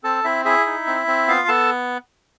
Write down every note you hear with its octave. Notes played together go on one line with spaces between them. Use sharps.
C4 A4 A5
C4 E4 E5
E4 G#4 E5
D#4
C4
C4
B3 F4 F5
B3 A4 A5